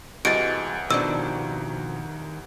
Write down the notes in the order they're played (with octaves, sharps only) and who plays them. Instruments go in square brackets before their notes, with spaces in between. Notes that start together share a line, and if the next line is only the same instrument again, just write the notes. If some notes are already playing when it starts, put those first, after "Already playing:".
[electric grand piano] C2 A6 [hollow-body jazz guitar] E3 G#3 F#4 [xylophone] D7
[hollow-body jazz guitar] B2 F3 D4 [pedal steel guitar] D#3 [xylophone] E6